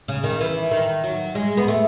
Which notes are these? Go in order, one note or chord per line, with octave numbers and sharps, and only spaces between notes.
C#3
D#3
E3
D#3
F#3
G#3
B3
A3